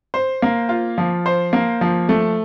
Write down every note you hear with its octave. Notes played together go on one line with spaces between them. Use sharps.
C5
A#3
F4
F3
C5
A#3
F3
A3